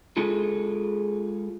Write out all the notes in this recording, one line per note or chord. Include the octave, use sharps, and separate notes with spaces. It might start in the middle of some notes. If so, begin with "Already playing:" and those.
G#3 F4 G#4 A4